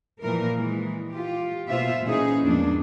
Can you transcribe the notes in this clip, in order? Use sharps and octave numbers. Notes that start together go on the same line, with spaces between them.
A#2 E3 F3 A#4
E3 G#3
F4 G4
B2 A#3 F4 C5 E5
A#2 E3 C#4 D#4 G#4
E2 G#2 F3 A#3 D4